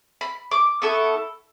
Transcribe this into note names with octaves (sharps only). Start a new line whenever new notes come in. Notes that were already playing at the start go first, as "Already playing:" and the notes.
B5
D6
B3 E4 A4 C#6